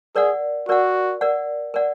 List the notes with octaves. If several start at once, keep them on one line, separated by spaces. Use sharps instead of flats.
G#4 A#4 D5 F#5
F#4 A#4 D5 F#5
A#4 D5 F#5
A#4 D5 F#5